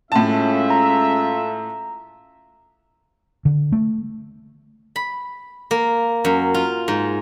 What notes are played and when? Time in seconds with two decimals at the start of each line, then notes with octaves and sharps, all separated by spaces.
0.12 A2 G#3 C#4 F4 A4 E5 A5
0.70 A#5
3.45 D3
3.72 A3
4.96 B5
5.71 A#3
6.25 F#2
6.54 F4
6.88 G#2